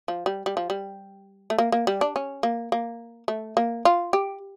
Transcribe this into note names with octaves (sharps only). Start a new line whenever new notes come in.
F3
G3
G3
F3
G3
A3
A#3
A#3
G3
D4
C#4
A#3
A#3
A3
A#3
F4
G4